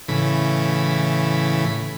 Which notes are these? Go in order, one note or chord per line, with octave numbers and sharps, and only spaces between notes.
A2 C#3 E3 B5